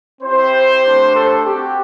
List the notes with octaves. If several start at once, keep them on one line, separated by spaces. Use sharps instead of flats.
C4 E4 G4 C5
A3 D4 G4
A4
C4 F#4 G4